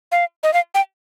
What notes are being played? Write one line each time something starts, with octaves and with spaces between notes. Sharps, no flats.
F5
D#5
F5
G5